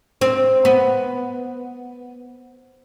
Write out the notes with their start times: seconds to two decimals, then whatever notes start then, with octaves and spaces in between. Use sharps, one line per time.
0.21 C4
0.65 B3